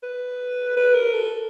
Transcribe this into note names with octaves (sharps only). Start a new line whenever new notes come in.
B4
B4
A#4
A4